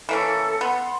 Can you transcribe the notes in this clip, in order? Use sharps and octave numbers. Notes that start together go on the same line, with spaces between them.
E3 A#3 C#4 A4
B3 C6